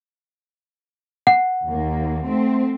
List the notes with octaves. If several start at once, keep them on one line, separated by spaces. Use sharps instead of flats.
F#5
D#2 A#3
A3 C4